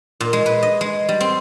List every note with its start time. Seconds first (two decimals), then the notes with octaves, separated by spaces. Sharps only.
0.20 A#2
0.33 G#3
0.46 B4
0.63 D#5
0.81 G#3
1.09 G3
1.21 C4